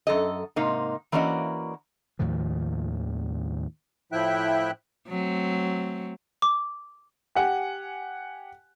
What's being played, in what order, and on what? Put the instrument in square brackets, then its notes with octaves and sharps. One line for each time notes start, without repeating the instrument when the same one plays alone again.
[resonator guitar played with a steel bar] F#2 A4 D#5
G#2 C3 A#3 D#4
E3 A#3 C#4 F#4 D5 D#5
[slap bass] D#2 A2 D#3 F3
[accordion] A2 F3 E4 E5 G5 F#6
[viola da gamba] F#3 A3 C4
[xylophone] D6
[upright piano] G4 F#5 G#5